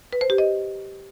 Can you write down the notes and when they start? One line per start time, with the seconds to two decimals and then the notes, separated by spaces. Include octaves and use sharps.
0.13 B4
0.21 C5
0.30 G4
0.38 D#5